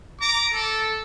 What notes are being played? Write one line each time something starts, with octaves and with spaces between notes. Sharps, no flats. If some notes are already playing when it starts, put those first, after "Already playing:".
A#5 D6
A4